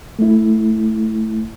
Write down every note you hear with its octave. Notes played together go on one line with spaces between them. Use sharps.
A3 E4